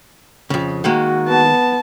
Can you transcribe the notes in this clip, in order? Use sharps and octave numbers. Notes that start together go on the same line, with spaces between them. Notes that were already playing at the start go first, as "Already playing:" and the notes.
F2 C#3
D#3 G#3 A#3 F#4
B3 A5